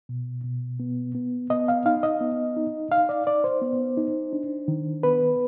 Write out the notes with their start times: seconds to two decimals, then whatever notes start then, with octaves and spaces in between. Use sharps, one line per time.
0.09 B2
0.44 B2
0.80 B3
1.15 B3
1.50 B3 D#5
1.68 F5
1.86 D#4 F5
2.03 D#5
2.21 B3
2.56 D#4
2.91 D#4 F5
3.09 D5
3.27 D#4 D5
3.44 C5
3.61 B3
3.97 D#4
4.33 D4
4.68 D#3
5.03 B3 B4